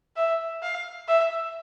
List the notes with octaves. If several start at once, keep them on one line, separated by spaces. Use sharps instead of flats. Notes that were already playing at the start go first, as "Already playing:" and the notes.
E5
F5
E5